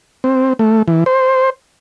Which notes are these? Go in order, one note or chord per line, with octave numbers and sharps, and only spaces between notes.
C4
A3
E3
C5